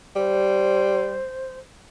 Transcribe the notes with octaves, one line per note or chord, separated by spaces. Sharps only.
G3 C5